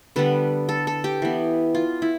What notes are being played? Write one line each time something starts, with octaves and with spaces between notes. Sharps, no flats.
D3 G3 B3 B4
A4
A4
G4
E3 B3
F4
E4